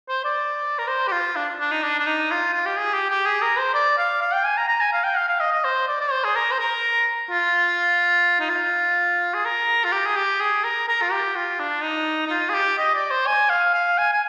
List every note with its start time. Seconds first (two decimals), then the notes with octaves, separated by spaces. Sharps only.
0.09 C5
0.24 D5
0.79 A#4
0.88 C5
1.08 G4
1.12 F4
1.36 D4
1.60 D4
1.72 D#4
1.83 D4
1.99 D4
2.07 D#4
2.31 F4
2.53 F4
2.66 G4
2.79 G#4
2.94 G4
3.10 G4
3.26 G#4
3.42 A#4
3.58 C5
3.74 D5
3.98 F5
4.22 F5
4.34 G5
4.45 G#5
4.57 A#5
4.69 A#5
4.81 G#5
4.93 F5
5.04 G5
5.17 F5
5.28 F5
5.40 D#5
5.53 D#5
5.65 C5
5.88 D5
6.01 D5
6.12 C5
6.24 G#4
6.36 A#4
6.51 C5
6.59 A#4
7.31 F4
8.40 D#4
8.49 F4
9.34 G#4
9.45 A#4
9.85 F4
9.92 G4
10.06 G#4
10.17 G4
10.41 G#4
10.64 A#4
10.88 A#4
11.02 F4
11.12 G4
11.36 F4
11.60 D4
11.83 D#4
12.27 D#4
12.30 F4
12.49 G#4
12.54 G4
12.78 D#5
12.94 D5
13.11 C5
13.26 G#5
13.50 F5
13.74 F5
13.98 G#5
14.13 G#5